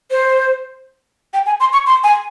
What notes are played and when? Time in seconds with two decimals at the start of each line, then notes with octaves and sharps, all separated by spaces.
0.11 C5
1.34 G5
1.46 G#5
1.60 C6
1.73 C#6
1.87 C6
2.04 G#5